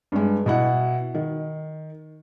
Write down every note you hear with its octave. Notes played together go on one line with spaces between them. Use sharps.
G2 G#3
B2 E4 F#5
D#3